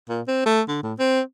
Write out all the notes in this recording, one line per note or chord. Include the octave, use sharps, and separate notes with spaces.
A#2
C4
A3
D3
A2
C4